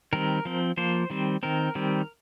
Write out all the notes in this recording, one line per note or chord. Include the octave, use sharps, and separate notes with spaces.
D#3 G3 C4 A#4
F3 C4
F3 A#3 C5
D#3 G3 C4
D#3 C4 A#4
D#3 G3 C4